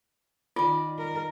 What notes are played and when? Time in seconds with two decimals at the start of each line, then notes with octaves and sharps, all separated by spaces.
0.56 D#3 F4 D5 D#5
0.98 A#4